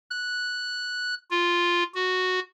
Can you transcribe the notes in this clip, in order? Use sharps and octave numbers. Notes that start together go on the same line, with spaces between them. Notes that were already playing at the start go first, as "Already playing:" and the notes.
F#6
F4
F#4